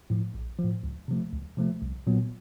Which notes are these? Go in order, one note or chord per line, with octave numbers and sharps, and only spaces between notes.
A2 F3
A#1
A2 F3
C#2
C3 F3 A3
C#2
C3 F3 A3
C2
A#2 F#3 B3